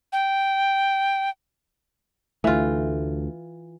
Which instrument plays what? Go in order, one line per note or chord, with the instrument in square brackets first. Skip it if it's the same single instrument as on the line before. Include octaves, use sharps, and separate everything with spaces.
[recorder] G5
[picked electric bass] D2 A3 [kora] E3 F4